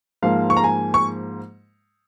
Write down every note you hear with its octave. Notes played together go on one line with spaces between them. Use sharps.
G#2 F3 A#3 F5
C#6
A#5
G#5
C#6